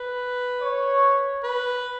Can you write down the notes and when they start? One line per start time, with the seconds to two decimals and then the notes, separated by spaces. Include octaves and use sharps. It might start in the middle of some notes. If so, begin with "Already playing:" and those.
Already playing: B4
0.61 C#5
1.43 B4